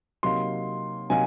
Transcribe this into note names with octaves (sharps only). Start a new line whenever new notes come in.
C3 F#3 A#3 D#4 C6
C3 F#3 A#3 D#4 G#5